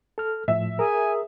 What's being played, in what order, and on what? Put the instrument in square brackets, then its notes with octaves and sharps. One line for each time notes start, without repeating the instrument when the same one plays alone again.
[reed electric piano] A4 F6
[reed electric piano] A2 F3 [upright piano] E5
[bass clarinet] G#4 [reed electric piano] A#4 [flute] G#5